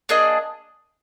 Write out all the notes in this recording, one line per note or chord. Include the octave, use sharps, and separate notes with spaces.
A#3 D4 G#4 D#5